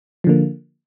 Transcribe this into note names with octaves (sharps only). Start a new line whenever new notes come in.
D3 F3 A#3